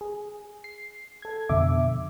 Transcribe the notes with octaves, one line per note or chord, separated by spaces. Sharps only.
G#4
C7
A4 G#6
F2 B2 D3 E5 D6